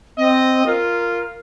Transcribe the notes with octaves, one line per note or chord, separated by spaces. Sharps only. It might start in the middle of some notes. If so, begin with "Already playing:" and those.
C4 D#5
F4 A#4